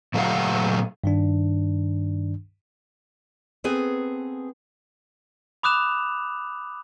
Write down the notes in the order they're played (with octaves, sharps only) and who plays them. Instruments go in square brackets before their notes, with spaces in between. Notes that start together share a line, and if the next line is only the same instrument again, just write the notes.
[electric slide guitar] A#2 F#3 A3 G4 F5 F#5
[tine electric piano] G2 D#3 D4
[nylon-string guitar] B3 C4 G#4 A4 B4 G#5
[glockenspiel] B5 D6 D#6 F#6 E7 F7